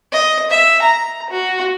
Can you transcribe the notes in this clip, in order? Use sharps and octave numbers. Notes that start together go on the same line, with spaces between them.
D#5
E5
A#5
F#4